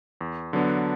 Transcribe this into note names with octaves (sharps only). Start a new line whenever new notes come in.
E2
D3 F#3 B3 D4